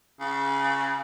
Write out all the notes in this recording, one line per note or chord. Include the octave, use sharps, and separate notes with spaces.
C#3